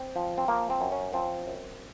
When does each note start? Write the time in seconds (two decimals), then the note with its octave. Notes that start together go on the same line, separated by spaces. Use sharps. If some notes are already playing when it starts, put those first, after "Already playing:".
Already playing: C4
0.16 F3
0.38 C4
0.48 F3 A#3
0.70 C4
0.81 F#2
0.92 C#4
1.13 F3 C4
1.47 F#2